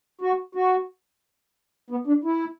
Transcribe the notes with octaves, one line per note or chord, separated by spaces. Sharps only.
F#4
F#4
B3
D4
E4